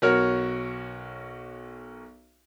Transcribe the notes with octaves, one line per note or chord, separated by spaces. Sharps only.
B1 F#4 A#4 C#5 F6